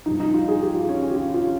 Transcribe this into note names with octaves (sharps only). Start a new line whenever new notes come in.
G2 F3 D#4
D#4
F4
G#4
G4
F4
C#4
C#4
G4
F4
F4